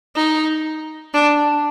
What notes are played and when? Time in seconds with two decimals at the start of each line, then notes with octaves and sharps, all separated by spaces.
0.15 D#4
1.14 D4